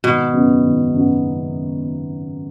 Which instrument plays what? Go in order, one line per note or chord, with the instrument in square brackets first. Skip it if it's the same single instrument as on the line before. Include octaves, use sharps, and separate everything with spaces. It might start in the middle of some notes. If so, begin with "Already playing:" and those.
[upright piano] G#1 [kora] B2
[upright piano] F#2 C#3 F#3 B3
G#1
F#2 C#3 F#3 B3